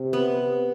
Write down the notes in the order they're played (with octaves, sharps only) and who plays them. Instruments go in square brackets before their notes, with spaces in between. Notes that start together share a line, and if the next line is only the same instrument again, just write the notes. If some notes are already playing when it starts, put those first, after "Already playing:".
Already playing: [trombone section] C3
[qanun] B3